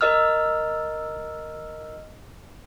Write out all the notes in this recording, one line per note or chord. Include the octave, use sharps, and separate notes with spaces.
A#4 D#5 E6 F6